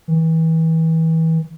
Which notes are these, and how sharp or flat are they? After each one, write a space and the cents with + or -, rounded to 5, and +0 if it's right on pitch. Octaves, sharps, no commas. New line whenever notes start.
E3 -30